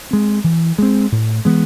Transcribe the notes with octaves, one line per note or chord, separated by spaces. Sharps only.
G#3 C4
E3
G#3 C4
A2
E3 G#3 B3